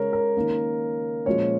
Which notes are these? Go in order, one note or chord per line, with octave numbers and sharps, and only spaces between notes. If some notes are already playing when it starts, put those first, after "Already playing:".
Already playing: C#3 G#3 C#4 A#4 C#5
A#4
D#3 A#3 C#4
A#2 F3 G#3 C#4 C#5